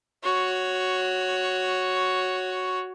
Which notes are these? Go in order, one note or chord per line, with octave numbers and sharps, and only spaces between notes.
F#4 C#5